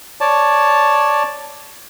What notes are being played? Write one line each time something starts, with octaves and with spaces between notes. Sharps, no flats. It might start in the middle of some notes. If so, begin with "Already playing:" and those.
C#5 D5 A5